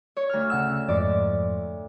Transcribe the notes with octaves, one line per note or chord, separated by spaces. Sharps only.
C#5
D2 F6
C#3 F#5 E6
F2 G#2 F3 D5